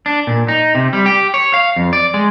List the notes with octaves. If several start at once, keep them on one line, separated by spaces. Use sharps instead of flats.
D4
A#2
D#4
C3
G3
G4
C#5
F5
F2
D5
G#3